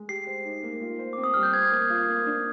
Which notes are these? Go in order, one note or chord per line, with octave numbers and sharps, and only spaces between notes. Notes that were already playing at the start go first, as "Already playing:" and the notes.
Already playing: G#3
G4 C7
C5
D#4
A#3
F4
C5
C4 D6
D#6
G3 F6
G6
C5 G#6
A#3
F4
A#3
D4